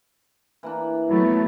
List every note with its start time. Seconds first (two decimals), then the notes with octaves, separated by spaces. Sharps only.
0.63 E3 A#3 D4
1.10 F#3 A3 B3 E4